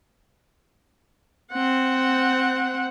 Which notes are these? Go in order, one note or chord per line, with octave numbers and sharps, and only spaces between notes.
C4 F#5